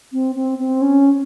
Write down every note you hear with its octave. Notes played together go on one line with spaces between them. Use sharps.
C4
C4
C4
C#4